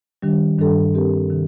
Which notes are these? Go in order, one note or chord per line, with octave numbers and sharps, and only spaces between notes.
D#3 G3 D4 G4
G2 D#3 G3 D4 A4
G3 C4 G4 A#4
C3 D#3